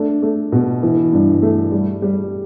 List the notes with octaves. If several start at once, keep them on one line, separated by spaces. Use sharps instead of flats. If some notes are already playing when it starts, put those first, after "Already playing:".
Already playing: A3 D4
A3
B2
E3
G2
A3
G3
G3